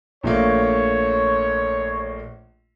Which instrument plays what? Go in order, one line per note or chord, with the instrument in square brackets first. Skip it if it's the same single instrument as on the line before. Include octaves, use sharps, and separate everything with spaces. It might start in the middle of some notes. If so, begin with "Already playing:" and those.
[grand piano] A#1 A3 A#3 [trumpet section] C#5